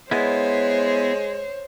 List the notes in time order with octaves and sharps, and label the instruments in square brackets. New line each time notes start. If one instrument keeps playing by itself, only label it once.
[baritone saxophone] G#3 [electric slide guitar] B3 E4 [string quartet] C5 C#5